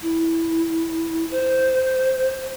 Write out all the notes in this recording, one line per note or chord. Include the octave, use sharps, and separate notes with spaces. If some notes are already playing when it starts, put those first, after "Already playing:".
E4
C5